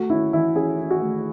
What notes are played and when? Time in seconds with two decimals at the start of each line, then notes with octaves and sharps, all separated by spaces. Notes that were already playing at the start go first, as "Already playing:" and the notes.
Already playing: A3 F#4
0.10 C#4 E4
0.33 E3 E4
0.55 C#4 G#4
0.79 C#4
0.91 F#4
1.02 A3